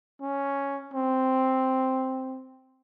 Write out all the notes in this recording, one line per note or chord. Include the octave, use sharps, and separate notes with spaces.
C#4
C4